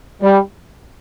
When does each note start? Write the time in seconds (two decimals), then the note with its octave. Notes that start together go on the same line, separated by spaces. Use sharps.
0.22 G3